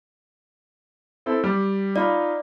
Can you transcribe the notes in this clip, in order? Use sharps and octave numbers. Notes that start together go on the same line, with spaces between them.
C4 E4 A4
G3
D#4 F4 D5 B5